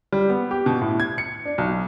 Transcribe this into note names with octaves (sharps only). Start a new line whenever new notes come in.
G3
B3
G4
B2
A2
G#6
C#7
D4
B1